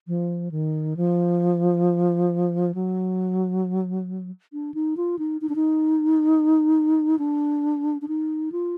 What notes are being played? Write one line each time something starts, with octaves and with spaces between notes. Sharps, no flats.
F3
D#3
F3
F#3
D4
D#4
F4
D#4
D#4
D4
D#4
D4
D4
D#4
F4